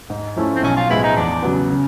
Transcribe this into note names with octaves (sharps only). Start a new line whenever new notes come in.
G#2
F3 A3 C#4 E4
C4
B1 C#4
F4
A2 F3 G#3 B3 E4
D#4
E2 D4
C#3 F#3 B3
C#3